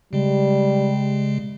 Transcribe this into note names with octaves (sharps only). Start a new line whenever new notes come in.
C#3 G3 G#3